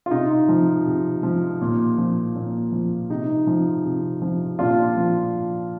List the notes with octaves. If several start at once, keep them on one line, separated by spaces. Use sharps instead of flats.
F4
C3 D#4
F3
C3
F3
A#2
F3
A#2
F3
C3 D#4
F3
C3
F3
A#2 D4 F4
F3